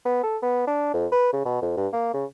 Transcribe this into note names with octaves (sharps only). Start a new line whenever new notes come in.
B3
A4
B3
D4
F2
B4
C#3
B2
F2
G2
A#3
C#3